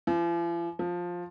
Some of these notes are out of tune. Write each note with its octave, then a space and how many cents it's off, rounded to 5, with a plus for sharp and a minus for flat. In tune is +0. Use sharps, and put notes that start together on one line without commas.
F3 -45
F3 +10